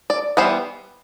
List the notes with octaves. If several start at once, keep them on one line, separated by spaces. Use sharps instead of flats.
D5
E3 G3 B3 C5